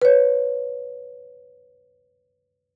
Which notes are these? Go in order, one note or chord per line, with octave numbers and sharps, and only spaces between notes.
B4 C#5